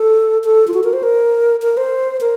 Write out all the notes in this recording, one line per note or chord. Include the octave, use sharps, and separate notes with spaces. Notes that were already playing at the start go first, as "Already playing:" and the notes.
Already playing: A4
A4
F4
F#4
A#4
C5
A#4
A#4
C5
A#4